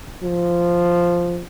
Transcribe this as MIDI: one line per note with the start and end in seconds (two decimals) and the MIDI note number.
0.24 1.41 53